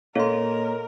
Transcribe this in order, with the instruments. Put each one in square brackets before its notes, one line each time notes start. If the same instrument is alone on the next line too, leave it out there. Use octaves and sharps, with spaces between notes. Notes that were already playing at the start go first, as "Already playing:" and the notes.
[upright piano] A#2 [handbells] A4 C6 [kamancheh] A#4 [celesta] C#5 D#5 F5